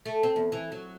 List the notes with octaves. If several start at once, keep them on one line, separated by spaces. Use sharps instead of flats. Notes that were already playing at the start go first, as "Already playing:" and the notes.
A3
C4
E2
E3
F#3